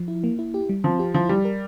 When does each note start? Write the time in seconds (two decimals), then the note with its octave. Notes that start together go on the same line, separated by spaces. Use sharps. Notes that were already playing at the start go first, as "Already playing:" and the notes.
Already playing: F3
0.08 E4
0.24 A#3
0.39 E4
0.54 G4
0.69 G3
0.84 F3 C4
0.99 G4
1.14 F3 E4
1.29 G3 G4
1.45 A#4